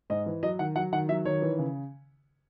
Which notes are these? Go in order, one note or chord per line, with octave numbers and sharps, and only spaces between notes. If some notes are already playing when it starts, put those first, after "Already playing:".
G#2 D#5
E3
F#3 D#5
D#3 F#5
F#3 F#5
D#3 F#5
F#3 E5
D#3 C#5
E3
C#3